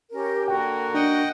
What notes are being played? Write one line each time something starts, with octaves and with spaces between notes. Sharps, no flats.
C#4 G4 A#4
D3 A#3 F#4 A#4 G5
D4 D#5 F#5 G5